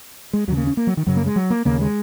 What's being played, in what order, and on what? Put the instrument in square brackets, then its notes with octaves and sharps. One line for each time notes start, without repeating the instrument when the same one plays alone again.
[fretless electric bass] G#3
D#2 F#3
C#3
A#3
C#4
A#3
F#3
D#3
F#2 C#3 F#3
A#3
G#3
F#3
A#3
D#2 C#3 A#3
G#3